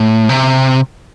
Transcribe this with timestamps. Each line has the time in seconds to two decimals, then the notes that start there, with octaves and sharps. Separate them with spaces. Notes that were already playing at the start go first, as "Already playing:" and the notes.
Already playing: A2
0.29 C3